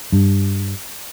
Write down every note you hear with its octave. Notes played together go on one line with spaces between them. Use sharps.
G2